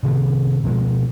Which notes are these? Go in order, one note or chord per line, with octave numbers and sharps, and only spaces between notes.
C3 D#3 G3 B3
B2 F3 G#3